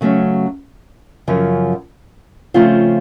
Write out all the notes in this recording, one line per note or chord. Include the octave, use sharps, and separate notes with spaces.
C#3 F#3 A3 C#4
F#2 C#3 F3
C#3 F3 A3 C4 F4